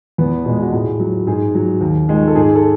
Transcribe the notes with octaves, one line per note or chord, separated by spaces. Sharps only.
E2 B3
B2 G#3
F#4
A2 G#4
F#3
G#2 G#4
F#3
D#2
D#3 G#3
A4
G#2 G#4
A4